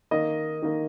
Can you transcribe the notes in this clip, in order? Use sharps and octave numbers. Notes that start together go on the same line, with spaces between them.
D#3 A#3 D#5
D#3 A#3